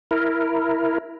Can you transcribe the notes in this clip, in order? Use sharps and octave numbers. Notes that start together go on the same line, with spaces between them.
E4 A#4